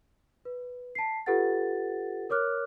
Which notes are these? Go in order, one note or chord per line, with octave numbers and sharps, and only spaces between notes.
B4
A5 B6 C7
F4 G4 A4 B4 F#5 A6
A#4 C#5 D6 F6 F#6